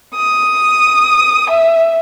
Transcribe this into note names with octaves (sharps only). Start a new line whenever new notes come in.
D#6
E5